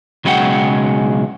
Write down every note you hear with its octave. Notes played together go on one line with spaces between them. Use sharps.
B1 C#3 F#3 G#3 F#5 G5